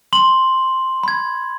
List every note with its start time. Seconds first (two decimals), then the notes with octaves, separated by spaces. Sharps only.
0.13 C6 F#7
1.03 B5 G#6